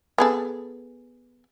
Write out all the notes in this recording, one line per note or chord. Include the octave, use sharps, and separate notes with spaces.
B3 G#4 A4